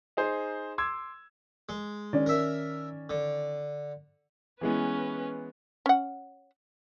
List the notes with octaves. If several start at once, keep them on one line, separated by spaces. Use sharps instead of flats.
D#4 G#4 C5
C6 D6 E6 G#6
G#3
D#3 C#4 D5
A#4 E5
D3
E3 G#3 B3 C#4 B4
C#4 F#5